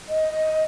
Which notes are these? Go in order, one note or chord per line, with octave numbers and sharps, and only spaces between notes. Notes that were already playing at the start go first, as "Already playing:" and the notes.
D#5